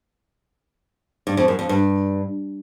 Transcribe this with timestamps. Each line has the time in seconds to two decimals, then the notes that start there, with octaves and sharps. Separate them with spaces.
1.27 G2
1.37 F2
1.48 F#2
1.59 F2
1.69 G2